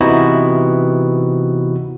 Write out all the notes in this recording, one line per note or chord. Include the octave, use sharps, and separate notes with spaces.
C3 E3 B3 D#4 E4 F#4